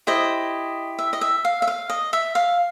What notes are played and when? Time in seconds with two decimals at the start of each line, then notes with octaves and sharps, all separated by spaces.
0.07 E4 G4 C5 D#5
0.99 E5
1.13 D#5
1.21 E5
1.45 F5
1.62 E5
1.67 F5
1.90 D#5
2.13 E5
2.35 F5